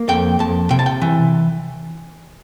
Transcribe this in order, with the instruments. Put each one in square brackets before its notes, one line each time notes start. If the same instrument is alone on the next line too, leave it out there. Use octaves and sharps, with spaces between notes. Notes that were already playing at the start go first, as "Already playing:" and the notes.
Already playing: [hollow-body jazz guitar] A#3
F2 G5
F2 A5
C3 G5
A5
G5
E3